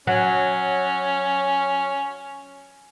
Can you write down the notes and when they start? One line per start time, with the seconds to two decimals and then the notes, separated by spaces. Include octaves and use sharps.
0.07 F#3 C#4